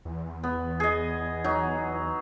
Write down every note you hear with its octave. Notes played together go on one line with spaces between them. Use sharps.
E2
B3
G#4 D#5
F#3 D#4